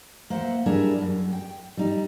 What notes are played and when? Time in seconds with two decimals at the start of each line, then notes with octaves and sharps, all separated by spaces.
0.30 A#3 C5 E5 F#5
0.66 G3 D4 E4 G#4 A#4
1.01 F#2
1.33 G5
1.77 G3 D#4